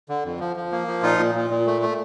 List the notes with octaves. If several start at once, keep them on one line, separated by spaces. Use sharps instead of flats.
D3
F2
F3
F3
A#3
F3
A#2 D#4 F4
A#2
A#2
A#2
A3
A3